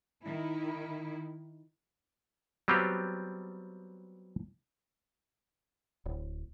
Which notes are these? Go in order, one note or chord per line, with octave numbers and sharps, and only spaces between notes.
D#3 E4
F#3 G3 B3 C4 F4 G4
D1